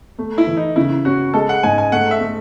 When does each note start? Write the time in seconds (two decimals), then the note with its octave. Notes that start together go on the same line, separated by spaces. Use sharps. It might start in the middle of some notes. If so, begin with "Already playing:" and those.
0.18 A3
0.38 E4
0.47 E3
0.57 D#4
0.76 C#3 E4
1.05 C#4 F#4
1.34 G#3 A4
1.49 F#5
1.63 G#2 G#5
1.78 G#5
1.92 A3 F#5
2.11 E5
2.20 A3